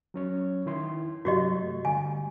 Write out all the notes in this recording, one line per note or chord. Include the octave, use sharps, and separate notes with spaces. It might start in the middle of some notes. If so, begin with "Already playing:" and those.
F#3 C#4 C#5
D#3 E4 C6
G2 C3 F#3 F#4 G4 D#5
A3
D3 G3 G#5